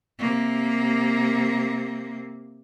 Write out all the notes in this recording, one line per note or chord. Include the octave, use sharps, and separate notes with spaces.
C3 A#3